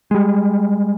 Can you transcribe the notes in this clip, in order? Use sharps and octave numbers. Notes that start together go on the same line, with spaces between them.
G3 G#3